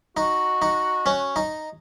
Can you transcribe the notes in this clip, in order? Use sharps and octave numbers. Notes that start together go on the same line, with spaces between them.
D#4 F#4
D#4
C#4
D#4